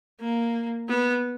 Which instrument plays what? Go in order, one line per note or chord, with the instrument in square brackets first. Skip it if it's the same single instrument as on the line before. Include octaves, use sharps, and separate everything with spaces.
[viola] A#3
B3